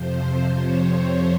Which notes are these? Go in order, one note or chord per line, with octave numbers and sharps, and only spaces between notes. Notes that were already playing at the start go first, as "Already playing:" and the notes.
Already playing: F2 C3 F3 C5
C#5